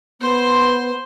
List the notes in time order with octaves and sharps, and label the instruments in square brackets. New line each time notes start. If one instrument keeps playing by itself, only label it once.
[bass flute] B3 [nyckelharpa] C5 C6